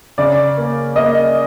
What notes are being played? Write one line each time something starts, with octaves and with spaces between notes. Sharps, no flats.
C#3 D5
A#3
A#3 D#5